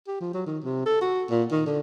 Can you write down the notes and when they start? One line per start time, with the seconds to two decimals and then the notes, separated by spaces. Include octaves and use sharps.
0.07 G4
0.20 F3
0.34 F#3
0.46 D#3
0.64 C3
0.86 A4
1.01 F#4
1.30 A#2
1.52 D#3
1.66 D3